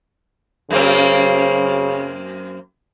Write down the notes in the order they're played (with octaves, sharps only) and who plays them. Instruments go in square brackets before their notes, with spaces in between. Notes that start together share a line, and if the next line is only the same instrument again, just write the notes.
[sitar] F#2 A#3 C4 [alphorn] C#3